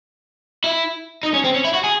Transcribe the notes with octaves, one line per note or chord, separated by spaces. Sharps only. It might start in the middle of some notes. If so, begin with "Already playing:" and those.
E4
D#4
C#4
C4
C#4
E4
F#4
G#4